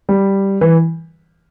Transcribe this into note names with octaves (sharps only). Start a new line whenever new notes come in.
G3
E3